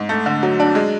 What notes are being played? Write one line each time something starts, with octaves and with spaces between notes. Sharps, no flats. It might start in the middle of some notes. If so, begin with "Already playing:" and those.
Already playing: G#2
A3
D3
F#3
D4
G#3